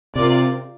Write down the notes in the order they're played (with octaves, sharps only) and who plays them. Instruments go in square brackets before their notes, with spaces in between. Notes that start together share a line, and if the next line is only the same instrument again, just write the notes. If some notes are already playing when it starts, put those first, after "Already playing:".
[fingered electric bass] C3 [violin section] F4 A#4 D5